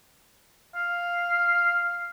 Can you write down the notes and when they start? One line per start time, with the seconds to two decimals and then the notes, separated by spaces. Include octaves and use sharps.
0.75 F5